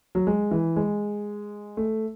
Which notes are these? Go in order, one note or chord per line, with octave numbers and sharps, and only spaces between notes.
F#3
G#3
E3
G#3
A3